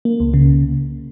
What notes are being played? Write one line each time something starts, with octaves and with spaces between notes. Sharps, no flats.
A#3
C#2
C#3